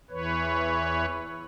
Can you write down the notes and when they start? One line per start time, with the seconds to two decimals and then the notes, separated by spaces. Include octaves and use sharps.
0.10 E2 E3 B4 C#5